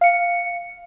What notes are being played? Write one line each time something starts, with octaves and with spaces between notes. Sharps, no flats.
F5 C#7